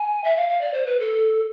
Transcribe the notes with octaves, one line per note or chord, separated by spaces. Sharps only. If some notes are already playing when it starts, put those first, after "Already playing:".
Already playing: G#5
E5
F5
F5
D5
C5
B4
A4